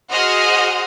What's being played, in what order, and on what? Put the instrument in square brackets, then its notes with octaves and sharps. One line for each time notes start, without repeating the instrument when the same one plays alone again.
[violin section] F#4 G#4 C5 D#5 F6